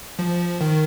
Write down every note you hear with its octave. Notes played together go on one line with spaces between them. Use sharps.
F3
D#3